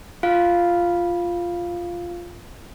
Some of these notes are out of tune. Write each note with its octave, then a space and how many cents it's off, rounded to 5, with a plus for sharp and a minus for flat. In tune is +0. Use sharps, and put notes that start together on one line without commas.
F4 -5 F5 +0